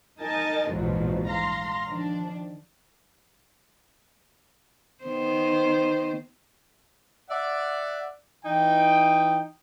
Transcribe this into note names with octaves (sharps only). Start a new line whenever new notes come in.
D#4 A#4 D#5 G#5 A5
A#1 E2 G#2 B2 F3 F#3
F5 A#5 C6
D#3 F3 D4
D#3 B3 C5
D5 E5 F#5
E3 D#4 G5